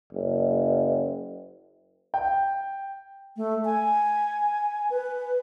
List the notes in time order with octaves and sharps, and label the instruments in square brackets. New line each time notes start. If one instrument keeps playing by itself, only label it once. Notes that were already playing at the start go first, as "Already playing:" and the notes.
[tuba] F#1
[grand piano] G5
[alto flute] A3
G#5
B4